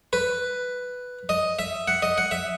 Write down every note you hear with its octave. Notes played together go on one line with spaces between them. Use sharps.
B4
D#5
E5
F#5
D#5
F#5
E5